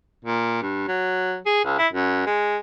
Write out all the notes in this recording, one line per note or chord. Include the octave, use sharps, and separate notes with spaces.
A#2
G2
F#3
G#4
C#2
E4
F#2
G#3